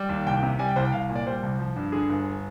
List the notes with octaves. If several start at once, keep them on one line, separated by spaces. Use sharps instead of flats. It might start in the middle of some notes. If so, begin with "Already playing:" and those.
Already playing: G3
D#2
C2 G5
G5
C3
G3 G#5
G5
C2 C5
G5
C2 F5
A#2
D5
G3 C5
C2
F3
G2
D3 G#4
G1